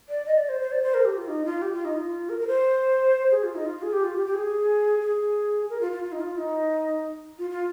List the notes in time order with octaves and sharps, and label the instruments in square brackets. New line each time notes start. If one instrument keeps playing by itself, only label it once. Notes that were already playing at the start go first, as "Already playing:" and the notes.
[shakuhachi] D5
D#5
D5
C5
C5
D5
C5
A#4
G4
F4
D#4
F4
G4
F4
D#4
F4
A#4
A#4
C5
G#4
F4
D#4
F4
G#4
G4
F4
G4
G4
G#4
G#4
A#4
F4
F4
F4
D#4
F4
D#4
F4
F4